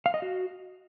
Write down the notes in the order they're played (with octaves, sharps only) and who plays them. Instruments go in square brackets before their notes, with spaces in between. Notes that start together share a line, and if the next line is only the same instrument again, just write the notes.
[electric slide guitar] F5
D#5
F#4